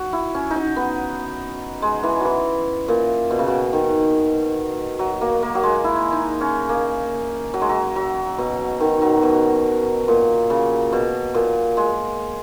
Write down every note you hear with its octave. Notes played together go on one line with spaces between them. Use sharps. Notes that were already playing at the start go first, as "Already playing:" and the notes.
Already playing: F#4
E4
C#4
D#4
C#4
B3
G#3
E3
E3 F#3
A#2
B2
C#3
B2
D#3
F#3
A#3
A#3
F#3
G#3
E4
D#4
C#4
A#3
F#3
G#3
F#3
F#3
B2
D#3
F#3
B2
A#2
C#3
B2
A#2
G#3